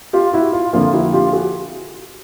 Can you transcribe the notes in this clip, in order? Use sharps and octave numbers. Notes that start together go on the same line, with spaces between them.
F4 G4
E4 F#4
F4
F2 D3 F3 A#3 F4
E4 F#4
F4 G4
F#4 G#4